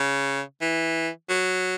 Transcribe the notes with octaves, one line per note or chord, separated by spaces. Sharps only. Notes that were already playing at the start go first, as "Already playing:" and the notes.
Already playing: C#3
E3
F#3